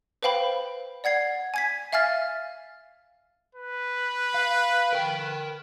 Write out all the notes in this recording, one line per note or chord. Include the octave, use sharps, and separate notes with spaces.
B4 C5 F5 G5 B5
D5 F#5 G#6 C7
G#5 G#6 B6
E5 F5 G#5 F6 A6
B4
F5
A#4 G5